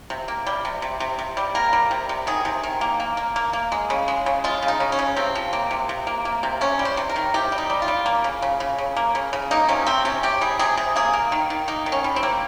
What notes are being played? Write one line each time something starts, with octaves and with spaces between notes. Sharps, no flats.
C3
A#3
G3
C3
C3
C3
C3
G3
A#3 A#4
G3
C3
C3
D#3 G#4
C3
D#3
A#3
A#3
A#3
A#3
A#3
G#3
C#3
G#3
C#3
G#3 F4
C#3
D#4
C#3
C#4
C#3
C3 C4
F3
A#3
C3
C3
A#3
A#3
C3
C3 C#4
G3
C5
C3
A#4
D#3
C3 G4
G3
D#4
G3
F4
G3
A#3
C#3
C#3
C#3
C#3
A#3
C#3
C#3
A#3 D#4
C3 C#4
C3 C4
C3 C#4
C3 G4
G3 G#4
C3 G#4
C3 G#4
A#3 G#4
A#3
D#3
D#3
A#3 D#4
D#3
C#4
G3
C4
A#3